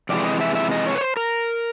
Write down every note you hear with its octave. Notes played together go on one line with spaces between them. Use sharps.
F2 C3 E3 G#3 D5
D#5
E5
E5
D#5
C#5
B4
C5
A#4